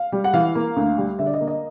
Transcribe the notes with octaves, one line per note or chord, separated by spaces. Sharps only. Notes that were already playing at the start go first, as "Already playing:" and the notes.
Already playing: F5
G3
F#5
E3 F5
A#3
D2
G3
D3 E5
D5
D#5
A#3
D#5